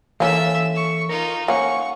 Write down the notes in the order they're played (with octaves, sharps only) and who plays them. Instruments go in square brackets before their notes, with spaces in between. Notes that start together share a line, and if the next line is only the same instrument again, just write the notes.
[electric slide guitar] E3 A4 [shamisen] A#3 C#4 [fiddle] E5 E6
[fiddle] C#6
[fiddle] D#4 F4 [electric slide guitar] A#4
[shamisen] A#3 C#4 [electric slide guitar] F#5 [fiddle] C#6